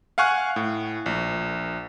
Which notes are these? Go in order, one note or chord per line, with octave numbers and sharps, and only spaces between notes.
F5 F#5 G#5 C#6 F6 F#6
A2
A#1